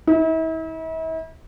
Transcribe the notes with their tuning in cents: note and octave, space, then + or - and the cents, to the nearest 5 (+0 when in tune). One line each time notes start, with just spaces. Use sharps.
E4 -40